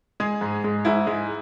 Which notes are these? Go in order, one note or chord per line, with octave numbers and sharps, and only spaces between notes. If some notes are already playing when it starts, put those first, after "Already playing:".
G#3 G#4
G#2
G#3
G#2 E4
G#3